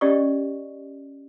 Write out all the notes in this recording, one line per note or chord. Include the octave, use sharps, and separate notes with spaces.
C#4 G4 D5 D#5 C#6